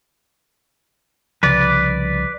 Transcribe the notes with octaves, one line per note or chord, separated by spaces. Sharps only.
C2 C#3 F3 B4 D5